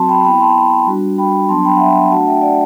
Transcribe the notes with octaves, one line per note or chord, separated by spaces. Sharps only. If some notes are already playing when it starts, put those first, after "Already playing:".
Already playing: F#3 C4 F#4 A5 C6
G5 B5
B3 E4 G5 B5
A5 C6
G3 D4 F#4
G5 B5
F#3 B3 D4 A5 C6
G5 B5
F#5
E5 G5
A3 D4 F#4 F#5 A5
E5 G5
D5 F#5